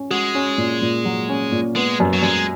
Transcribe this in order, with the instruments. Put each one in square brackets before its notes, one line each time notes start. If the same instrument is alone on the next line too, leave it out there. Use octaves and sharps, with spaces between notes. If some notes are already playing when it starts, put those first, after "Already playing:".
Already playing: [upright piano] C#4
[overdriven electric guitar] G#3 [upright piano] F#4
[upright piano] C#4
A#2
A#2
F#3
C#4
A#2
[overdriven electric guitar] G#3 [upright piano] B3
[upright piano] F#2
[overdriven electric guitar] F#3
[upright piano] F#2 [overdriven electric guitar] G#3